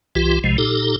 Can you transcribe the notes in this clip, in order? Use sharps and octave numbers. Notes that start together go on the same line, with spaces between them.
C2 E3 F4 G4
B1 C3 F3 G#3
A#2 D#4 G4 A4